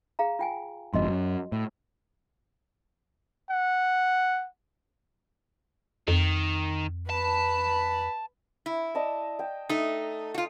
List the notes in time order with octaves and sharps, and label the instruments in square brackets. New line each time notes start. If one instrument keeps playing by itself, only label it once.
[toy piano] G#4 F5 A#5
F4 G5 G#5
[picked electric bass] G1 F2 G#2 [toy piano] F#4 D#5 C6
[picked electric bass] F#2
A2
[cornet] F#5
[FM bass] F2 [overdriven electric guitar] D#3
[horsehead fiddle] B4 B5 [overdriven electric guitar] A5
[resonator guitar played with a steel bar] E4
[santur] D5 D#5 A5
G5
[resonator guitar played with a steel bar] A3 D#4 [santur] D#6
[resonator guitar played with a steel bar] F4 F#4